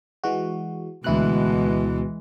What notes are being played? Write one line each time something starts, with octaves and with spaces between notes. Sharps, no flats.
E3 G#3 F#4
D2 B2 E3 G#3 E4 F#6